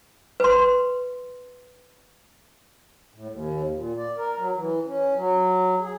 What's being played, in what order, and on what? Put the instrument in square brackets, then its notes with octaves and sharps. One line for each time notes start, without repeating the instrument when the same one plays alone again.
[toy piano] B4 C6
[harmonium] A2
D#2
A#2
D5
A#4
F#3
E3
C#4
F#3
G#4